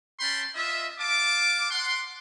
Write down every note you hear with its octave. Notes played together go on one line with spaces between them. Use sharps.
C#4 G5 A5 B5 C6
F4 D#5 E5
F5 A5 D6
F#5 C6